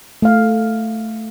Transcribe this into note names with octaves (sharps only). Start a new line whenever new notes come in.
A3 F5